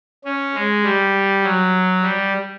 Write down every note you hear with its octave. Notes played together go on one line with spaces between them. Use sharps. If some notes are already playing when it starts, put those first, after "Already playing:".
C#4
G#3
G3
F#3
G3